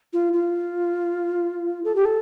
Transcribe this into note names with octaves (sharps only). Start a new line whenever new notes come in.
F4
F4
A4
G4
A4